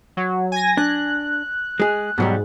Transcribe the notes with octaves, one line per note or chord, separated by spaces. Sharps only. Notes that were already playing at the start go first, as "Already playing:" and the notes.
F#3
G#5 G#6 A#6
D4 F#6
G#3 G#4
G#2 B2 F#3 G3